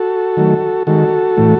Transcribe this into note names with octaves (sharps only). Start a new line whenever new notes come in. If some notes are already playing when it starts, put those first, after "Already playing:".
Already playing: F#4 A4
D#3 F#3 A3
D#3 G#3 F#4 A4
A2 E3 A3